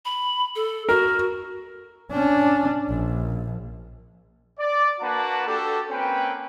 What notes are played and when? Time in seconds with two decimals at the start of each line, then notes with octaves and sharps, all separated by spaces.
0.05 B5
0.55 A4
0.89 F#4 A#4
2.11 C#4 D4
2.88 A#1
4.59 D5
5.00 A#3 D4 F#4 B4 F#5 A5
5.47 D4 F#4 G4 A4
5.90 A#3 C4 C#4 B4 G5